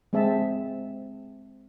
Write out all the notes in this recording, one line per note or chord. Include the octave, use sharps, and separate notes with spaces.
G#3 C4 G#4 E5 A5